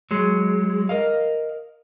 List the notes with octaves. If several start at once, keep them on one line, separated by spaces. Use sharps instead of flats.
F#3 G#3
A#4 D#5 F5